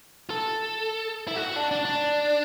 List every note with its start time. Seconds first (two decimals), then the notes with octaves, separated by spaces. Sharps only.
0.30 A4
1.28 E4
1.36 F#4
1.56 D4
1.71 D4
1.85 D4